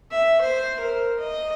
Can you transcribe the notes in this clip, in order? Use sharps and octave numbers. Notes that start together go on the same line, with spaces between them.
E5
C5
A#4
D#5